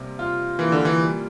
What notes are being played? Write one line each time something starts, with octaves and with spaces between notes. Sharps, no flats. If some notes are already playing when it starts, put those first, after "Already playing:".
Already playing: C3 G3 A#3
F4
E3 A#3
D3
E3
G3